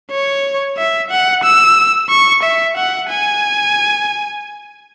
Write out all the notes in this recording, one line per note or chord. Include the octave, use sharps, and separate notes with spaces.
C#5
E5
F#5
E6
C#6
E5
F#5
G#5